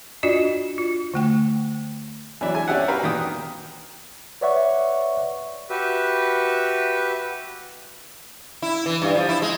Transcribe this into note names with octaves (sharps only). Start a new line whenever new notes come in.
D4 F4 F#4 D5 D#5
F4
D3 A3 G5
E3 F#3 D4 E4
G#3 G#5
C#4 D4 G4 D5 E5 F#5
F#4 A#4 B4 F5 G5 A#5
A#2 D#3 G5 D#6
B4 C#5 D5 E5 F#5 C#6
F#4 G4 B4 E5
E4
E3
G2
F3
E4
G#3